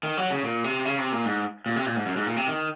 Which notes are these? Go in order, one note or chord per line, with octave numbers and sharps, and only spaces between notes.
D#3
F#3
C#3
A#2
C3
C#3
C3
A#2
G#2
A#2
C3
A#2
G#2
F#2
G#2
A#2
C3
D#3